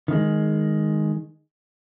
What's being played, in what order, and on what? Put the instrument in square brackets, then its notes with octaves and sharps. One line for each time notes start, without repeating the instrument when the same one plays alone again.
[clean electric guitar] D#3 G#3